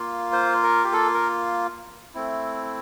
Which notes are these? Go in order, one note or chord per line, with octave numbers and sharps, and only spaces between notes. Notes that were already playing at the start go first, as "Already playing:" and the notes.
Already playing: A#3 F4
C5
A#4
G4
A4
A#4
A3 C4 E4